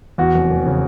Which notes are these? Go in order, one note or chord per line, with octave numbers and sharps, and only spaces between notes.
E2 F#4
F1
F1
C#3